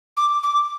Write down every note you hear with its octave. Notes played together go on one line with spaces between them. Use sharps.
D6
D6